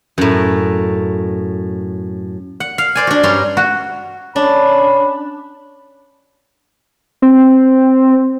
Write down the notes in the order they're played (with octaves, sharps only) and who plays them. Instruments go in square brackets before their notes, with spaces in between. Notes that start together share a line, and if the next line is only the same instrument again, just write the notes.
[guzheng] F#2 A2
F#5
F5
C5 D5 G#5
D4 F#4
G2 C#4 A#5 C6
[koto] F#4
[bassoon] C#4 [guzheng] D4 [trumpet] B5
[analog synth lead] C4